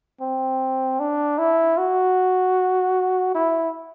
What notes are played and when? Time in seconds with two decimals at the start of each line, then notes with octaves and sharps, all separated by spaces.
0.21 C4
1.00 D4
1.38 E4
1.78 F#4
3.35 E4